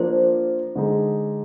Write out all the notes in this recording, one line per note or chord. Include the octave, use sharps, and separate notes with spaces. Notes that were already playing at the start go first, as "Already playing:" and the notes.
Already playing: F3 A#3 D4 F4 A#4 C5
D3 G#3 D#4 G#4